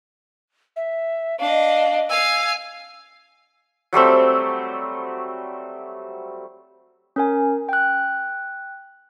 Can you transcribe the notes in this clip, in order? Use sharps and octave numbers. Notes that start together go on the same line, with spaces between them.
E5
D4 D#5 F5
F5 G#5 E6
F#3 G3 A3 C4
C#4 A#4 G#5
G5 F#6